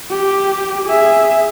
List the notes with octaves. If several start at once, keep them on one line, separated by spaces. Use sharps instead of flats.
G4
G#4 E5